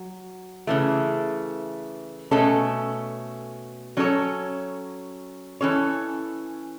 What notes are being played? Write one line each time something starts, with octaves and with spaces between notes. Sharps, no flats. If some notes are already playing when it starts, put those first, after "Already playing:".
Already playing: F#3
C#3 E3 A3
B2 A3 C#4 A4
F#3 C#4 A4 C#5
E3 C#4 A4 C#5